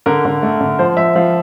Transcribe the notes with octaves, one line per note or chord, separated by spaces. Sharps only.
D3 A#4
D3
A3
D3
F3 C5
F3 E5
F3 F5